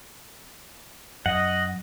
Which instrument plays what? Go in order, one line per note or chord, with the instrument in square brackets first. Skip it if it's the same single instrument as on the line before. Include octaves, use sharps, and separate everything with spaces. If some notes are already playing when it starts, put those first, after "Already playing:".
[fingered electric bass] F#2 [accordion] D#5 [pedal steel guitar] F#5